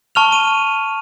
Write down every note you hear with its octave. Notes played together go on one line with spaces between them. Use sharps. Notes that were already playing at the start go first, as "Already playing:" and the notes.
A5 C#6 F6 F7
D#7